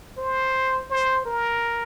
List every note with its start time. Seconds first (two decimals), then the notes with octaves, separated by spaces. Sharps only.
0.18 C5
0.90 C5
1.26 A#4